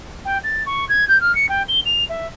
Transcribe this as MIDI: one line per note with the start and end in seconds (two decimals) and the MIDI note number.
0.25 0.38 79
0.43 0.63 93
0.66 0.87 85
0.89 1.07 92
1.08 1.20 91
1.20 1.34 89
1.35 1.49 97
1.49 1.62 79
1.68 1.80 103
1.85 2.04 101
2.09 2.27 76